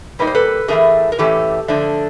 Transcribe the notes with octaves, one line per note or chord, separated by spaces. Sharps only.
A#2 G3 A#3 D#4 B4
C5
A4 B4
A2 E3 A3 C#4 G#4 A#4
A#4
A2 E3 A3 C#4 G4 A4
D3 F3 A3 D4